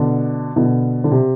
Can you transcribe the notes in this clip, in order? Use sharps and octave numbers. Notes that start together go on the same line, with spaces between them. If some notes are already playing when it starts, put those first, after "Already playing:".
Already playing: B2 D3
B2 D3
D3
C3